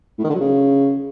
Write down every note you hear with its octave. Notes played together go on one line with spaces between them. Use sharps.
A2
D#3
D3
F#3
C#3